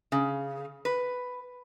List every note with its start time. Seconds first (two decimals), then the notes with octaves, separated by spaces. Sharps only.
0.12 C#3
0.85 B4